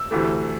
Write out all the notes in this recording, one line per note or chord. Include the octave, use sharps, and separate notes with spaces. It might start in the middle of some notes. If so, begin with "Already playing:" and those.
Already playing: E6
D2 C3 E3 A3